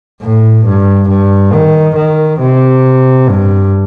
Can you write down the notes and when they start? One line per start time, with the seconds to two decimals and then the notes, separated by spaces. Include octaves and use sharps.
0.22 A2
0.65 G2
1.09 G2
1.53 D#3
1.96 D#3
2.40 C3
3.28 G2